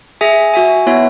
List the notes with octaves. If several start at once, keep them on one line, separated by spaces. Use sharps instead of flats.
G#4 E5 G#5
F#4 E5 G#5
B3 E4 C#5 E5